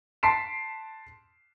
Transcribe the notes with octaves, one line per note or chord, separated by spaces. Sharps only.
A5 C6 B6 C7 D7 E7